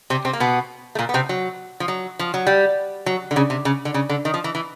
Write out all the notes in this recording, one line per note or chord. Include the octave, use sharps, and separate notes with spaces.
C3 C4
C3 C4
A#3
B2 B3
A3
A#2 A#3
B3
C3 C4
F#3
F3
F#3
F3
F#3
G3
F#3
D3
C#3
C3
C#3
D3
C#3
D3
D#3
F3
E3
E3